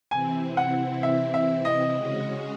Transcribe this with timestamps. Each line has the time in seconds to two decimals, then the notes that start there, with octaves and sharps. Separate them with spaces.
0.11 C3 E3 C4 E4 G#5
0.57 F#5
1.03 E5
1.34 E5
1.65 D#5
1.96 C#3 G#3 C#4 F#4